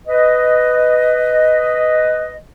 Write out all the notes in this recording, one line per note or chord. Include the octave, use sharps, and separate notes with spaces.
B4 D#5